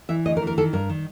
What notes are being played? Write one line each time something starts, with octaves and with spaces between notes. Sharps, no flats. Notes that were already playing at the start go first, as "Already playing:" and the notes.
E3 E5
D2 D#5
A#4
E3
A#4
D#3 A4
G2 A#4
D#3